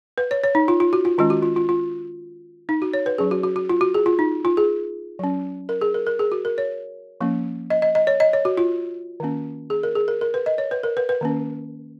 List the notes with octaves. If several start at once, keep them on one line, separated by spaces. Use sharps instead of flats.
B4
C#5
C#5
D#4
F4
F4
F#4
F4
D#3 G#3 C#4 F4
F#4
F4
F4
F4
D#4
F#4
C#5
B4
F#3 C#4 G#4
F#4
F#4
F#4
F4
F#4
G#4
F4
D#4
F4
G#4
F#3 C#4
A#4
G#4
A#4
A#4
G#4
F#4
A#4
C#5
F3 A#3 C#4
D#5
D#5
D#5
C#5
D#5
C#5
F#4
F4
D#3 A#3 C#4
G#4
A#4
G#4
A#4
A#4
B4
D#5
C#5
B4
A#4
B4
B4
D#3 A#3 C#4